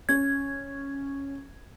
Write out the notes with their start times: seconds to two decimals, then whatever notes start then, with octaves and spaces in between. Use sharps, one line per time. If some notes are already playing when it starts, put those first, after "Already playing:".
0.09 C#4 G#6